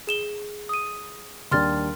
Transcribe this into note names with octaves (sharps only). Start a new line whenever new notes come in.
G#4 E7 G7
D#6 D#7
D#2 G3 D4 C6 F6 A6